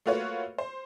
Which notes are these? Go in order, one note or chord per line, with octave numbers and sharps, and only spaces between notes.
A3 A#3 F4 F#4 B4 C#5
C5